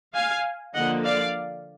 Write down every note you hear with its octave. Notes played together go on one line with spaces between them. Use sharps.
F5 G#5
D3 F3 A#3 D#5 F#5
D5 F5